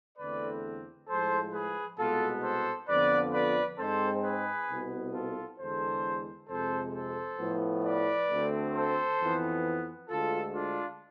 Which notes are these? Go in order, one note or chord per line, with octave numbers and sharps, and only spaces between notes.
E2 D3 A3 C4 B4 D5
A2 F3 G#3 A4 C5
G#4 B4
C2 B2 G#3 B3 F4 A4
A4 C5
F2 D3 F3 B3 B4 D5
B4 D5
G#2 G#3 C4 A4 C5
G#4 B4
C2 B2 B3
F4 A4
E2 D3 G#3 A4 C5
F2 C3 G#3 A4 C5
A4 C5
A2 F3 B3
B4 D5
D2 D3 A3 C4
A4 C5
F2 E3 B3
D2 D3 G#3 F4 A4
D4 F4